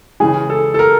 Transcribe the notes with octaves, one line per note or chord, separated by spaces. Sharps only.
C#3 E3 G#3 G#4
A4
A4
A#4